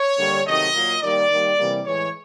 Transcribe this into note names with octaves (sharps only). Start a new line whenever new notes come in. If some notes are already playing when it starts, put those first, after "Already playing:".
Already playing: C#5
D3 G3 A#3
C3 D#3 F#3 A3 D#5
A#2 F#3 A#3
D#3 G3 A#3 D5
D#3 G3 A#3
C3 E3 G3 A#3
A2 E3 G#3 C#5